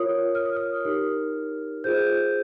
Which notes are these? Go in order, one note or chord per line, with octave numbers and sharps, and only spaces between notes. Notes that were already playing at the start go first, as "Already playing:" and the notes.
Already playing: F4 A#4 C#5 D#6
F6
D#6
F6
D#4 G4 A#4
F4 G#4 C5 G6